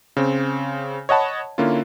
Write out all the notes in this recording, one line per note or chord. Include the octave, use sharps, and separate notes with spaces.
C#3 C4
C#5 D#5 F#5 A5 B5
D3 A#3 C#4 E4 F4